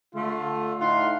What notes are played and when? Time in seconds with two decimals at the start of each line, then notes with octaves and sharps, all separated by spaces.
0.15 D3 A3 F4
0.80 A2 D#4 F4 F5 F#5 C6